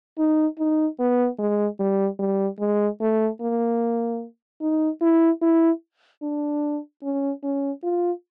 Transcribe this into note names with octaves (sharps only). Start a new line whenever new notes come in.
D#4
D#4
B3
G#3
G3
G3
G#3
A3
A#3
D#4
E4
E4
D4
C#4
C#4
F4